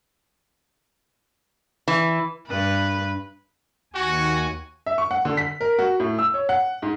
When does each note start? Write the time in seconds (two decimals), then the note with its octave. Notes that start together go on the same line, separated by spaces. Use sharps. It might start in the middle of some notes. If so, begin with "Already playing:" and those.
1.88 E3
2.47 G2 B4
3.93 D#2 F#4 G#5
4.86 E5
4.98 C#6
5.11 F#5
5.25 D3
5.37 B6
5.61 A#4
5.79 F#4
6.00 A2
6.19 E6
6.34 C#5
6.49 F#5
6.82 G#2